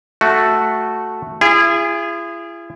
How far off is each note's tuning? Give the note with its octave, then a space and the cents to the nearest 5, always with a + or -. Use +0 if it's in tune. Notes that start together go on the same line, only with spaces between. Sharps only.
A3 +0 F#4 +0
E4 +45 G#4 -20